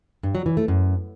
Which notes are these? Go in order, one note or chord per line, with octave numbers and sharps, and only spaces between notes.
G2
F#3
E3
A3
F#2